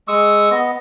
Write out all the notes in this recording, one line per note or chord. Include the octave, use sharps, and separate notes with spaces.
G#3 C#6 D#6 E6
B3 D#5